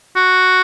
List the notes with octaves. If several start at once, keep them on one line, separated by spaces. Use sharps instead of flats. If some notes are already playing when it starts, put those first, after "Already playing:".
F#4